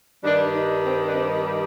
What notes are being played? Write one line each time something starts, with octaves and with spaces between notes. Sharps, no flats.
G2 D#3 G3 D4
D#4
C4
D4
C4